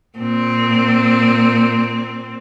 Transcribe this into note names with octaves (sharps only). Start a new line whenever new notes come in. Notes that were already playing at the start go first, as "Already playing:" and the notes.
A#2 C4